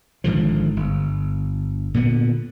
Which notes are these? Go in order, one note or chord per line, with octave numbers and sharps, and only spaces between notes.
G#1 G#2 D3 F3
G1
A#2 D3 B3